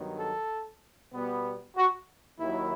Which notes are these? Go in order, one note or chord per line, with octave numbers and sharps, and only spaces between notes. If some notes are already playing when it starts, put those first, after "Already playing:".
Already playing: G2 D#3 F#3 B3
A4
B2 G3 B3
F#4
D#2 D#3 F#3 E4